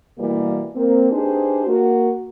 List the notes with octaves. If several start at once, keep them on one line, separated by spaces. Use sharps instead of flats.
B2 E3 G3 A#3
A#3 C4
D4 D#4 G4 G#4 B4 C5
A#3 F#4